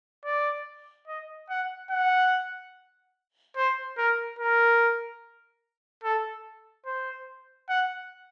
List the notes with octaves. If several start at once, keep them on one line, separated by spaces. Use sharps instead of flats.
D5
D#5
F#5
F#5
C5
A#4
A#4
A4
C5
F#5